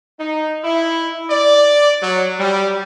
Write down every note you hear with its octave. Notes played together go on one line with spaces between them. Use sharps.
D#4
E4
D5
F#3
G3